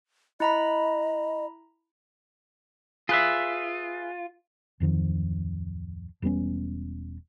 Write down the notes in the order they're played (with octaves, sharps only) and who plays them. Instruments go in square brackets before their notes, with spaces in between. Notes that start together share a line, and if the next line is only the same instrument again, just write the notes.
[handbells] E4 A#5 B5 [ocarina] D#5
[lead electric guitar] F4 [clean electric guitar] G#4 B4 E5
[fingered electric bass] D1 F2 D#3 F3
E1 G3 B3 C#4